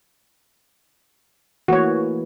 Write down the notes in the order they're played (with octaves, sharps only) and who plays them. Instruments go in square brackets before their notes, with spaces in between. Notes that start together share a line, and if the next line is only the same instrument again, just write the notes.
[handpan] E3 A3 A#3 [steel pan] F#4 C#5